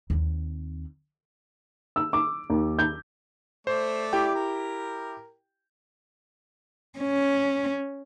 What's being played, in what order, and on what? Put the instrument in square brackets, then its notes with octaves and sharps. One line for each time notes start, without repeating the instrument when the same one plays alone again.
[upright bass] D#2 C4
[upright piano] E6
D6
D#2
G6
[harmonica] A3 D5 [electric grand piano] C5
[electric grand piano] E4 G4 G5
[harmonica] A#4
[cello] C#4